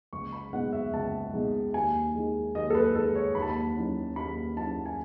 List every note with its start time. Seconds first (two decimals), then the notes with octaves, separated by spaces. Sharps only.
0.12 C#2 C#6
0.33 B5
0.53 B2 G#3 D#4 F#5
0.73 E5
0.93 C#2 A5
1.33 B2 G#3 D#4
1.74 D#2 G#5
2.15 D#3 G#3
2.55 D#2 D#5
2.70 A4
2.75 B4
2.95 D#3 G#3 A4
3.15 C#5
3.35 D#2 B5
3.42 A5
3.50 B5
3.76 D#3 F#3 C#4 E4
4.16 D#2 B5
4.57 D#3 F#3 C#4 E4 A5
4.86 G#5